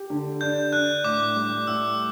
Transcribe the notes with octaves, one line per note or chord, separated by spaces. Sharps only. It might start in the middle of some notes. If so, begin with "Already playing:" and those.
Already playing: G4
D3
D4 G6
D4 F#6
A2 D6
G3
A2 E6